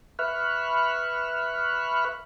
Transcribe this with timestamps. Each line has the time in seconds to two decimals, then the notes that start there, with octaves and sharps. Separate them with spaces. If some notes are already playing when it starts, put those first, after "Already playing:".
0.19 B4 E5 B5 C#6 F6 F#6